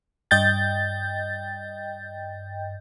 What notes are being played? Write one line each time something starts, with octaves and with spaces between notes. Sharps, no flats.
G2 D#5 G5 G6 A6